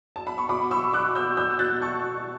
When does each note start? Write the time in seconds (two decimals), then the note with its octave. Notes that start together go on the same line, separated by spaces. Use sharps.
0.16 A5
0.27 B5
0.38 C#6
0.49 B2 B5 D6
0.71 C#6 E6
0.93 D6 F#6
1.15 E6 G6
1.37 B2 E6 G6
1.59 F#6 A6
1.81 A5 C#6